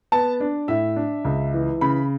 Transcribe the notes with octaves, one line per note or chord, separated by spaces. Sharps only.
B3 A5
D4
A2 E5
D4
C#2
E3
C#3 B5